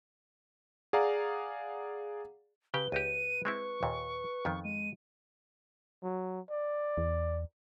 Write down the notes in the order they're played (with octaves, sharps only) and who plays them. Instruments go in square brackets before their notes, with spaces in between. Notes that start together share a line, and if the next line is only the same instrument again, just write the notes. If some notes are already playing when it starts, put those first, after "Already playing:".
[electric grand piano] G#4 D5 F5 F#5 A#5
[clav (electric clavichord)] C#3 G4 [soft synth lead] B4 [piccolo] G7
[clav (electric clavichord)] C#2 D#4 G4 [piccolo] D#7
[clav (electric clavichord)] G#3 C4 E4 [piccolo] C#6
[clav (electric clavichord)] D#2 A#2
F2 D#3 B3
[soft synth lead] G#3 [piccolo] D#7
[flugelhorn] F#3
D5
[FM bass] E2